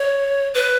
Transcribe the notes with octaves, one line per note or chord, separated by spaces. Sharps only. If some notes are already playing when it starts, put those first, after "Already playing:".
Already playing: C#5
B4